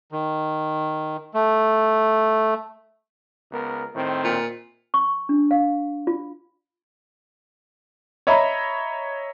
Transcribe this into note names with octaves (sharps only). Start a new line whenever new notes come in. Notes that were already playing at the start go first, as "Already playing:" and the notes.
D#3
A3
C#2 B3 A#4
A2 D#3 C4
A#2
C#6
D4
F5
F4
C#5 D#5 E5 A#5 B5